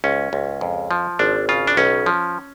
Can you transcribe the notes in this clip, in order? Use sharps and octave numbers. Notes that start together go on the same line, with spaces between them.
C#2 C#4
C#2
F2
F3
G#1 D4
C#3 F4
D4
B1 C#4
F3